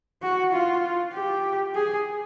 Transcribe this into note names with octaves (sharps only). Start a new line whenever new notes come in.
F#4
F4
G4
G#4